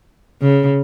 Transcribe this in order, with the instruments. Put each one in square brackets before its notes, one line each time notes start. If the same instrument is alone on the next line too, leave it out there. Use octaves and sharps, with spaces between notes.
[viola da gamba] C#3